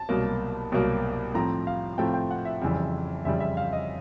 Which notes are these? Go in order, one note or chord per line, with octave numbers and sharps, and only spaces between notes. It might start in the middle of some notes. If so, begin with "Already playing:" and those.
Already playing: A5
C2 B2 F#3 A#3
C2 B2 F#3 A#3
A2 F3 A3 C4 A#5
F5
A2 F3 A3 C4 G5
G5
F#5
E5
F2 C#3 E3 G3
F2 C#3 E3 G3 E5
E5
F5
D#5